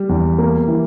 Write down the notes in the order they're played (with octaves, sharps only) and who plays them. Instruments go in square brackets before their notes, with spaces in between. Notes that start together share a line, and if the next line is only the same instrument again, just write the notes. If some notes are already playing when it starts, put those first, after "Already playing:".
Already playing: [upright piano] G3
[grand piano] E2
A#3
E3